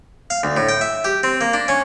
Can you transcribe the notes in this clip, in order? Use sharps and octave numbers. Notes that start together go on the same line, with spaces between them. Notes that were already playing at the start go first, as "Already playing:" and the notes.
F5
D2
A2
G5
E5
G4
C4
A#3
D4
C#4